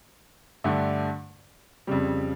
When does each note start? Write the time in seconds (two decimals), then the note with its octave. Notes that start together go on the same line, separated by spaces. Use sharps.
0.64 G2 D3 A3
1.87 F2 C#3 G3